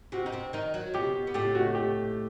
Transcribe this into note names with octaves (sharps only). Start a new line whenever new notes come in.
C3 C4 F#4
D#4
C3 C4
D#3 D#4
F#3 F#4
B2 B3 G4
B3
A2 A3 G4
F#4
G4